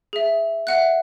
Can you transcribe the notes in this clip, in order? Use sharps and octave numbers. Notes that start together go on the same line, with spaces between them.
G#4 E5
E5 F#5 F#6